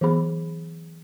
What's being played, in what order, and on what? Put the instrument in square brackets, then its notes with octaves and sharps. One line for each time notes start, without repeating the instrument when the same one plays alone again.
[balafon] E3 F#3 B3 G#4 B5